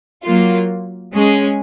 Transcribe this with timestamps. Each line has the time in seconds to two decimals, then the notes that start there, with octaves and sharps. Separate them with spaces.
0.25 F#3 A#3 F4
1.13 G#3 C#4 G#4